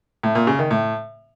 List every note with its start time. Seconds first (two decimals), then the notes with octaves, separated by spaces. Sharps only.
0.23 A2
0.35 A#2
0.47 C#3
0.59 D#3
0.71 A2